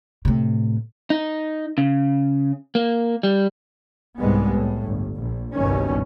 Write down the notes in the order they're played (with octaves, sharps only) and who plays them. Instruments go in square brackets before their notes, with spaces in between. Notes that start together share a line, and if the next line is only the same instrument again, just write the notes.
[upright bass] A2 C3
[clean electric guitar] D#4
C#3
A#3
G3
[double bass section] C2 G#2 G3 G#3 B3
A2
G1
A#1
F#1 C2 G2 B2 D#3 C#4